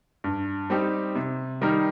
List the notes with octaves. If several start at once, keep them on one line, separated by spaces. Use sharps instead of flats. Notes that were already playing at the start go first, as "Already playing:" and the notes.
G2
G3 C4 D#4 G4
C3
D#3 G3 D#4 A#4